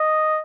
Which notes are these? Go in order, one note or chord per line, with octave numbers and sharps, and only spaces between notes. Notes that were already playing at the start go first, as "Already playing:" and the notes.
Already playing: D#5